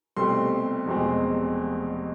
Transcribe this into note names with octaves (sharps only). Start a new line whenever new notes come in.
C2 B2 A3 C4 C6
F1 E2 B2 G#3 C4